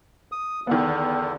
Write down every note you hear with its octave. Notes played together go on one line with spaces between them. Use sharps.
D#6
E2 D3 D#3 B3